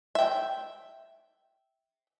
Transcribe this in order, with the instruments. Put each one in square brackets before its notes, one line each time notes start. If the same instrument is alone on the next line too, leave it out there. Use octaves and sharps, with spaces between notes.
[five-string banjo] E5 G5